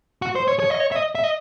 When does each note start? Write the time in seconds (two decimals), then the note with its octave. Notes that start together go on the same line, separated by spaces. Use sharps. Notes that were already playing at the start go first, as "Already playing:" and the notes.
0.22 F#4
0.35 C5
0.48 C#5
0.60 C#5
0.70 D#5
0.80 C#5
0.92 E5
0.96 D#5
1.15 E5
1.24 D#5